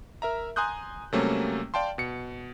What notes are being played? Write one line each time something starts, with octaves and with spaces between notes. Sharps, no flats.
A#4 E5 A#5
G#5 A#5 C6 D#6 F#6 G6
C3 F#3 G3 A3 A#3 C#4
D5 F5 G5 A5 C6
B2 C#7